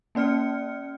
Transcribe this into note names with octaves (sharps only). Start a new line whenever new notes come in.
A#3 C#4 D5 F6 C#7